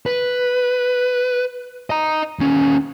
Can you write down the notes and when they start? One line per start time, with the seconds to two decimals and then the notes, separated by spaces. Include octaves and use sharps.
0.06 B4
1.90 D#5 A#5
2.39 D#2 C#4